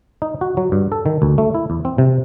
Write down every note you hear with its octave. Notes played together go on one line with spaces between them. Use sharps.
D#4
F#4
F#3
G2
A4
D#3
D2
A3
E4
E2
C4
C3